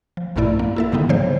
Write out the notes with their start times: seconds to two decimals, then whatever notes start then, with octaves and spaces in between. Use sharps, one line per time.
0.17 F3
0.36 A#1 G2 A#2 A3 E4 D5
0.59 A#3
0.76 E4 A4 E5
0.92 G#2 D3 D#3 G3 B3 D#4
1.09 C#3 F3 G3 G#3 C5 C#5